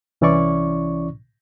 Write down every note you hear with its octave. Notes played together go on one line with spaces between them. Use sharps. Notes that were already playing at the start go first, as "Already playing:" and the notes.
C2 E3 C#4 E4 D5 C#6